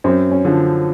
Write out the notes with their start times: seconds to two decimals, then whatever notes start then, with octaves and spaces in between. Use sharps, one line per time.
0.04 F#2 C4
0.31 C#4
0.44 D3 F3